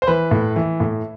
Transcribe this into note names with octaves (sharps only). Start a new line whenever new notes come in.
C5
E3 B4
A2
E3
A2